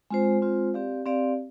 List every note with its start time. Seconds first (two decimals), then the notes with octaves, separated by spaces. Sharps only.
0.10 G#3 C4 F4 C5
0.42 G#3 C4 F4 C5
0.74 C4 G4 D5 F5
1.06 C4 G4 D5 F5